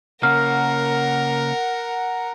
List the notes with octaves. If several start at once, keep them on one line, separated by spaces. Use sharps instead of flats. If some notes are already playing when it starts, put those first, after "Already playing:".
C#3 A#3 A#4 F#5 A#5 F6